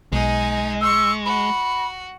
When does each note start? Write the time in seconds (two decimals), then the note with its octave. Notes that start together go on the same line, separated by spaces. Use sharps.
0.12 B1 G#3 D#4 G#5
0.81 C6 C#6 E6
1.25 F#4 B5